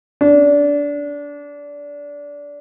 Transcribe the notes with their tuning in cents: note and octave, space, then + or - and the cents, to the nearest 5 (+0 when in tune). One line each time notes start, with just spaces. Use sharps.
D4 -20